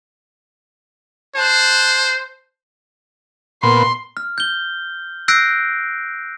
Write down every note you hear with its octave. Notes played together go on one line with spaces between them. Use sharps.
C5 A5 F#6
A#2 B3 C6
F6
G6 G7
E6 F#6 G6 A#6 C7 D7